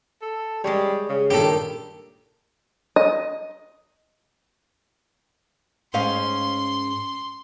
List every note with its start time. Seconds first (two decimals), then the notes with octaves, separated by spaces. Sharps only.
0.22 A4
0.64 G3 G#3 G#4 C#5
1.09 C#3
1.30 G2 A#2 D#3 G4 A4
2.96 D#5
5.94 G#2 C#4 F5 C6